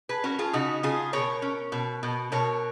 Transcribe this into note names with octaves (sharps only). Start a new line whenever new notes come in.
G#4 B4
C#4 F#4 A#4
F4 G#4
C#3 D#4 F#4
C#3 F4 G#4
B2 A#4 C#5
C#4
B2
B2
B2 A#4 C#5